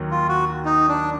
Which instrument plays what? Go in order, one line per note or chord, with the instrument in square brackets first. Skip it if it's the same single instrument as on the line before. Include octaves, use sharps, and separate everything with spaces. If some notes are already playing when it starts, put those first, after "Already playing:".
Already playing: [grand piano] D#2 D#3 F#3
[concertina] F4
F#4
D#4
D4